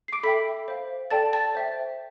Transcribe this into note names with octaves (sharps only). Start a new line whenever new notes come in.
C7
D6 D7
A4 E5 G5 B5 B6
C5 F5
A4 D5 G5 A5 A6
A5 A6
C5 E5 G5